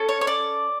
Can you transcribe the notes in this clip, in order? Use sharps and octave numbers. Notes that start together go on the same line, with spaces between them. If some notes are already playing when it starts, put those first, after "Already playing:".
Already playing: C#4 A4
C#5
C#5
D5